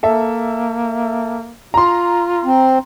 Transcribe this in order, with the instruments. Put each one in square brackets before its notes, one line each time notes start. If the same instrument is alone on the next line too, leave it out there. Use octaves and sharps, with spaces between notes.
[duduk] A#3 [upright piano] A4 E5
[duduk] F4 [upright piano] A#5 C6
[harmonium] C4